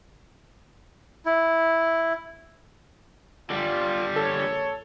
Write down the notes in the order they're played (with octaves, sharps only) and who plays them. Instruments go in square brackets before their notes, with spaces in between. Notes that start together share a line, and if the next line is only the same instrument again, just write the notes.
[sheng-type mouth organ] E4
[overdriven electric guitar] D3 G3 [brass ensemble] F4
[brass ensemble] A#1 C#5 [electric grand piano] A4